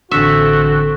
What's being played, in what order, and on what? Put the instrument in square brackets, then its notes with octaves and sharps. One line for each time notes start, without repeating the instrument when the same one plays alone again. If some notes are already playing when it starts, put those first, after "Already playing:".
[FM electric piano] A1 D3 C#6 [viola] C4 A4 [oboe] F#4 [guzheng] E5